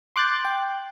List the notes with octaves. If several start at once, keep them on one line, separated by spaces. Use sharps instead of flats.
C6 D6 F#6 G6 A6
G5